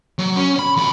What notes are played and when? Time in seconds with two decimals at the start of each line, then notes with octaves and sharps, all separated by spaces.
0.19 F#3
0.36 C#4
0.59 B5
0.77 F2 B5